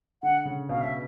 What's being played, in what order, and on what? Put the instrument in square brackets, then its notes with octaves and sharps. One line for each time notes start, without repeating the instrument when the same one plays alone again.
[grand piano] D3 [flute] F#5
[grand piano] C#3
[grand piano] B2 [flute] F5
[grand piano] B2 [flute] E5